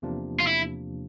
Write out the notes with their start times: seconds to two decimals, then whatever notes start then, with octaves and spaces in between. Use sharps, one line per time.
0.02 E2 C3 F3 A#3 D4
0.40 F4
0.47 E4